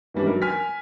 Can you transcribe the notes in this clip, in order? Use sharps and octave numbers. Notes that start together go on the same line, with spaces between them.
D#3 E3 G3 C#4 D4
F#3 A#4
G#5 F6 B6